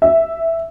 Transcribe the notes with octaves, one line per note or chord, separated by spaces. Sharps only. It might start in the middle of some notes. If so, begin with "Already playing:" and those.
E5